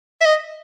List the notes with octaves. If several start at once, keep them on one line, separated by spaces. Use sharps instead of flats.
E5
D#5